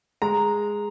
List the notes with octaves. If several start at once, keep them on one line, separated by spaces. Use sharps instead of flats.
G#3 A#5